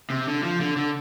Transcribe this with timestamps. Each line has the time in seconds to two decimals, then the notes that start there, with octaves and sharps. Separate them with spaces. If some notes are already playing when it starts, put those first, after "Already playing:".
0.10 C3
0.27 D3
0.43 F3
0.61 D3
0.77 D3